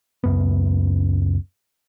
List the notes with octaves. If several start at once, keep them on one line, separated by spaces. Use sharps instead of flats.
C#2 F#2 B3